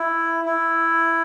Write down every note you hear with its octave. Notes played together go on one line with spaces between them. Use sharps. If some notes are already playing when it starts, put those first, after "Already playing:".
Already playing: E4
E4